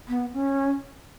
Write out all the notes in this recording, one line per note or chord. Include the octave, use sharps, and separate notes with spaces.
B3
C#4